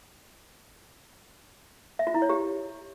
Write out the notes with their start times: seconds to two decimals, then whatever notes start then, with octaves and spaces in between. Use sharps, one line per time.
1.99 E5
2.07 F4
2.14 E4
2.22 C#5
2.29 G4